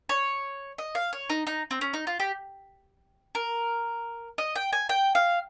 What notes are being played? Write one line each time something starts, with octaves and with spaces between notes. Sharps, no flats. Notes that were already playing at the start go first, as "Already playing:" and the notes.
C#5
D#5
F5
C#5
D#4
D#4
C4
C#4
D#4
F4
G4
A#4
D#5
G5
G#5
G5
F5